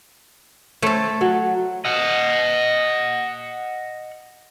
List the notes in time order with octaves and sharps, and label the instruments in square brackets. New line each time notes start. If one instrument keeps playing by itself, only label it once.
[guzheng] A3 A4 [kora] C5 C#5
[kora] F#3
[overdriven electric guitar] D#5 F#5